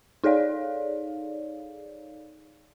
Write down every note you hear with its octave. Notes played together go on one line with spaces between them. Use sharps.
D#4 G#4 A4 C#5 D5 F5